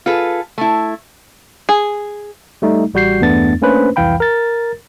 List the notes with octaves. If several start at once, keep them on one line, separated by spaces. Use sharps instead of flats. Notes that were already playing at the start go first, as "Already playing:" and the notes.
F4 G#4 A4 B4
A3 E4
G#4
G3 A3 D#4
A1 G3 F#4 G6 C7
E2 G2 A3 B3 D4 A6
A3 A#3 C#4 D4 B4 C5
C2 F2 E3 F5 G5 B5
A#4 A6